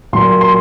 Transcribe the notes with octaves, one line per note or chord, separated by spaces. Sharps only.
A#2 F#3 A#3 C6
C6